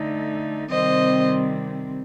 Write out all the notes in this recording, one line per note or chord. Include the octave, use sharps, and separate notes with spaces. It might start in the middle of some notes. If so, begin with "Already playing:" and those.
Already playing: D3 A3 D#4
C3 D#3 G3 C4 C5 D#5